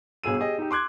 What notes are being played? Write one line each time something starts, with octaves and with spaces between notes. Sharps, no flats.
G1 B2 G#4 E6 D#7
G4 G#4 D#5
D#4 G4
C6 D6 F#6 G#6